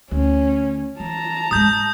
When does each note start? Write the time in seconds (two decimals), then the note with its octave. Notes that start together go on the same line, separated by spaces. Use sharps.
0.11 D2 C#4
1.00 E3 A5 A#5
1.51 G#2 G#3 D#6 G6